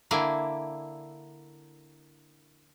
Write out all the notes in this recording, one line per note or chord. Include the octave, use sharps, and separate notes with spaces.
D3 A#3 E4 G#5